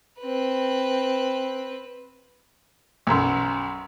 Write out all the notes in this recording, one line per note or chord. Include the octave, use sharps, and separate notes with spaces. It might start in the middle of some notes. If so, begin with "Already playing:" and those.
C4 B4
B1 F#2 G#5 A#5 C6